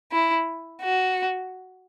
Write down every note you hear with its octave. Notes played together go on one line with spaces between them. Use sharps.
E4
F#4